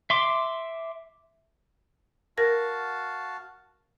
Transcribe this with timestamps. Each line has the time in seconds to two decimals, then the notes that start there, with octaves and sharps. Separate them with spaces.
0.10 E5 C6 D6
2.38 F#4 A#4 F5 A5 A#6